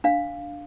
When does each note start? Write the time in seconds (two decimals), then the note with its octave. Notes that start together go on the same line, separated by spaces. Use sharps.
0.04 D4 F5